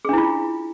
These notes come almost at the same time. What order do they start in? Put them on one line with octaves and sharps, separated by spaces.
G#4 D4 E4 F4